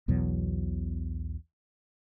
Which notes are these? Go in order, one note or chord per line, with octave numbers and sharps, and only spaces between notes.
B1 E2 B2 F#3